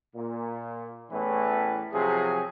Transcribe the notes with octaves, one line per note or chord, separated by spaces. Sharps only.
A#2
E2 A2 E3 C#4 B4
C3 F3 F#3 G#4